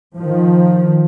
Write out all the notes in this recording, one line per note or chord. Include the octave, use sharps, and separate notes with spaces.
D#3 F3